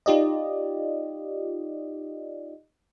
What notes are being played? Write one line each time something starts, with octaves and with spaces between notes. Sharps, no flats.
D#4 F4 G4 D5 D#5